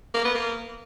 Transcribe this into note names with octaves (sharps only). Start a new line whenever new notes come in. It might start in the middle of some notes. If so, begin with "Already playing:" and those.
A#3
B3
A#3